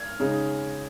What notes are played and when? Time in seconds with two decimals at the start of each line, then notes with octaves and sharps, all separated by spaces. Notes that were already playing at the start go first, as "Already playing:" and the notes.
Already playing: F6 G#6
0.20 C#3 G#3 D#4